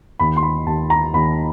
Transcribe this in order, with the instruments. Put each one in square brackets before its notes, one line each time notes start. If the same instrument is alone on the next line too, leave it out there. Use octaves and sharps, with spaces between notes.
[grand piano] D#2 B5
C6
B5
D#2 A5
A#5
D#2 B5